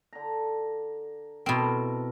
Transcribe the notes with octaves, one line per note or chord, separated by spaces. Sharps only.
D3 A#5
B2 C4 E4 A4 A#4